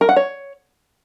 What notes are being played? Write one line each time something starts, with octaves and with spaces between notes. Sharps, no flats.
A#4
F#5
C#5